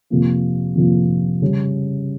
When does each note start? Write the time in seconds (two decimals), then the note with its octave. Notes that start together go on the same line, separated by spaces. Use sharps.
0.10 F2 C3 F3 A#3
0.76 F2 C3 F3 A#3
1.42 C#3 G3 C#4